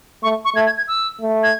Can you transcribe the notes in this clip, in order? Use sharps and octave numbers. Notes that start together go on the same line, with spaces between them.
A3 C#6
C#6
A3 G#6
G#6
G#6
E6
A3
G#6